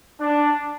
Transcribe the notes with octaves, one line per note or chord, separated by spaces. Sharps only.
D4